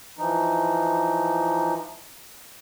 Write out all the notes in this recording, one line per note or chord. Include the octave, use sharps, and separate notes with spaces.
E3 F3 D#4